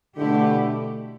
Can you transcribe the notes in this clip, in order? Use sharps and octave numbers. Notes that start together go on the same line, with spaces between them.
B2 D3 A3 E4 G4